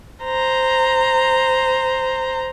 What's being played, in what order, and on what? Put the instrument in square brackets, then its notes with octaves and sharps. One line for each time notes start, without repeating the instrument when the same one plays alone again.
[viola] C5 A#5